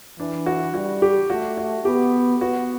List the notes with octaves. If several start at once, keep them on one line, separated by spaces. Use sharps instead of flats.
E3 D4
F#4
G3 F#4
G4
A3 F#4
F#4
B3 G4
B3 F#4